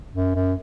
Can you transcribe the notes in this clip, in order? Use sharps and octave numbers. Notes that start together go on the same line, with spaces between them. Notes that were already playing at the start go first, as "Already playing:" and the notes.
F#2
F#2